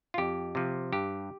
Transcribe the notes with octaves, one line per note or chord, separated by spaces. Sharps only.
F4
F2 G4
C3 F3
G2 G4